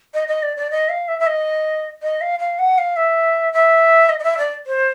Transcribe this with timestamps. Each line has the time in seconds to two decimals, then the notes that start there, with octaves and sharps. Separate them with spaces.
0.14 D#5
0.28 D#5
0.43 D5
0.57 D5
0.71 D#5
0.89 F5
1.08 E5
1.20 E5
1.27 D#5
2.03 D#5
2.21 F5
2.39 F5
2.59 F#5
2.78 F5
2.96 E5
3.53 E5
4.09 D#5
4.19 D#5
4.23 E5
4.38 D5
4.67 C5